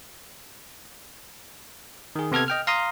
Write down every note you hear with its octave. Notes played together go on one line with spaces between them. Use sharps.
D#3 G#4
C3 B3 A4 F6 G#6
D#5 G5 F6
F5 A#5 C6 D#6